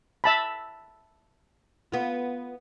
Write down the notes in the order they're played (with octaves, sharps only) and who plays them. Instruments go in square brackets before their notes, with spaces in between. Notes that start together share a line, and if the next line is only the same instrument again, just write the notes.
[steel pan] E5 A5 B5
[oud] B3 F4